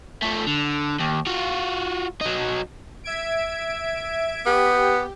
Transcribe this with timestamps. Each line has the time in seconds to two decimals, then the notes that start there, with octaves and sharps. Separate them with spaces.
0.23 A3 F4
0.47 D3
0.99 D#2
1.27 F4 F#4
2.21 F#3 D#4
3.04 E5 G#6 D7
4.46 B3 G4